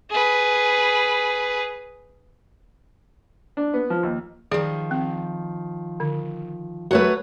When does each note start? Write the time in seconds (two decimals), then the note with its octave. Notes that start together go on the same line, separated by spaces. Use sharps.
0.10 G#4 B4
3.57 D4
3.74 B3
3.90 F3
4.03 D#2
4.51 D#3 F3 G#4 D5
4.91 C4
6.00 D3
6.91 F#3 A3 B4 C#5 F#5